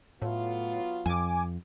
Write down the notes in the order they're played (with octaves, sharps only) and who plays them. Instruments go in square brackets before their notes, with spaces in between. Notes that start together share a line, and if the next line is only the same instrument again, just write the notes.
[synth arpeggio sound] A2 [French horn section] F#3 B3 F4
[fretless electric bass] F2 [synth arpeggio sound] G#5 D6